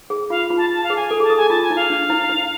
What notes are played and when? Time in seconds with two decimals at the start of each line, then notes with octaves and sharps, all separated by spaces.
0.10 G#4
0.30 F4 F5
0.50 F4
0.57 A5
0.70 A5
0.84 F5
0.90 G#4
0.96 G#5
1.11 A4
1.20 G#4
1.23 A5
1.30 A4
1.37 G#4 G#5
1.50 F4 A5
1.63 G#5
1.70 E4
1.76 F5
1.90 D4
2.10 E4
2.30 E4